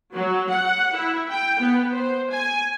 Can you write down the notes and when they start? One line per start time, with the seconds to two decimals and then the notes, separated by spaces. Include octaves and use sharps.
0.14 F#3
0.52 F#5
0.96 E4
1.31 G5
1.60 B3
1.94 C5
2.31 G#5